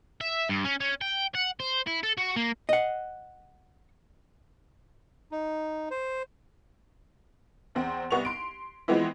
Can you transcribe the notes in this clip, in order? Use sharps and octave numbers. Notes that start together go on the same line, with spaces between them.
E5
G2
C#4
C#4
G5
F#5
C5
E4
A4
F#4
A#3
D#5 F#5
D#4
C5
E2 C4
C2 B3 C#6 F7
C6 D7
E3 F3 G#3 B3 C4 E4